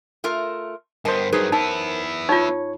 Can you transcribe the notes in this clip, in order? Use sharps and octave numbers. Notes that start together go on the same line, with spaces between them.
A3 F4 A#4
G2 B3 A#4 C5 D#5 A5
G2 F#3 D#4 G#4 B4
F#2 B3 D#4 E4
D#4 F4 C#5